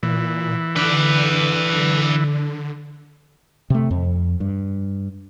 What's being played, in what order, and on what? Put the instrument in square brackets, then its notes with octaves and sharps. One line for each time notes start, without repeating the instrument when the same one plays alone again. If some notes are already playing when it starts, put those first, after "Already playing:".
[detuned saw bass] A#2 [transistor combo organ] E3
[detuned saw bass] D3 [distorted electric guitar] B4 D5
[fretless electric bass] C3 A3
F2
G2